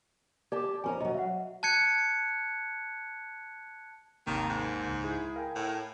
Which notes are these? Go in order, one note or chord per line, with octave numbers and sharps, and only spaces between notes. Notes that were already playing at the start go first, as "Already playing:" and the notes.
G4 D5 A5 D6
F2 C#4 G#5 A#5
D#2 F#3 D#5
E5 F#5
A5 F#6 G#6 C#7
G#1 D#2 C3 D#3 A#3
G#2
C#2
E4 G#4
A#4 F5 G5 G#5
A2